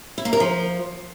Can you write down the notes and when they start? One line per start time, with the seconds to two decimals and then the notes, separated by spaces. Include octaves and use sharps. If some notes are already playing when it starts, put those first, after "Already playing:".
0.18 E4
0.25 A#3
0.33 A#4
0.40 F3